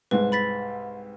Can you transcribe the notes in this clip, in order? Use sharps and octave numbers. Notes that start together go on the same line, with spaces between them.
C2 G#2 B4
B5 A6 B6